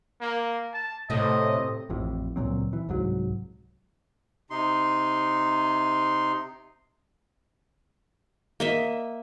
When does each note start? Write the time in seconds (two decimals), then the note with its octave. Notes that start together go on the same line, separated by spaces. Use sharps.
0.20 A#3
0.73 A5
1.10 A2 C3 A3 D#5
1.89 A1 F2 A2
2.36 C#2 A#2 F#3 C4
2.73 E3
2.89 C2 G#2 F#3
4.50 C3 D#4 C6
8.60 A#3 D#5 E5